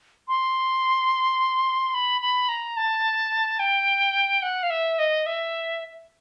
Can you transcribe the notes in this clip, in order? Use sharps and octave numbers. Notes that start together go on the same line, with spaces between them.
C6
B5
B5
A#5
A5
G5
F#5
F5
E5
D#5
E5